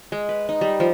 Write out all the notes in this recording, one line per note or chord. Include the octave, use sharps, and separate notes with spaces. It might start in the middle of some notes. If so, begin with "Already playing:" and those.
G#3
B4
D#4
G3
F3